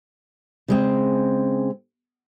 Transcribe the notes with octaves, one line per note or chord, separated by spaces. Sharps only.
C#3 G#3 C4